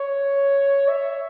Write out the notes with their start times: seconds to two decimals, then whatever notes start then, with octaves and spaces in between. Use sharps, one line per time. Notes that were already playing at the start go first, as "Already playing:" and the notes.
Already playing: C#5
0.89 E5